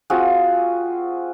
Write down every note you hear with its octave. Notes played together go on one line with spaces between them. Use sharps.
C4 F4 F#4 G#4